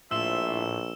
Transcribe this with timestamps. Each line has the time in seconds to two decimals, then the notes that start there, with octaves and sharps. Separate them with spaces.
0.11 A#1 A2 F4 C5 E5 E6 E7 G7